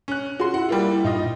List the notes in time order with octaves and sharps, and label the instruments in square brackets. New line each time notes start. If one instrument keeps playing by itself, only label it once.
[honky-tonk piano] C#4 F#6
[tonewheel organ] F4 G#4 [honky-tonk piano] F#4 C6
[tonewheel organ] E4 [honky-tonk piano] F#5
[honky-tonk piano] G3 A#3 F4
[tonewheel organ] G2 A#2 [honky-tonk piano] D#4 F4 D#5